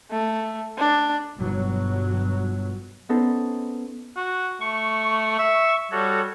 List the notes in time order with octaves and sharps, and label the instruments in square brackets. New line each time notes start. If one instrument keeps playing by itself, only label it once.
[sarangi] A3
D4
[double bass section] G1 B2 F#3
[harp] B3 C#4 D#4 A4 C5
[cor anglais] F#4
[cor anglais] A3 [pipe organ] C#6
[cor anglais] E5
[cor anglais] G3 [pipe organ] F#4 A4 C#5